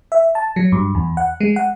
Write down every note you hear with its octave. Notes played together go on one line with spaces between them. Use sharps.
E5
A5
F#3
G2
E2
F#5
G#3
F#5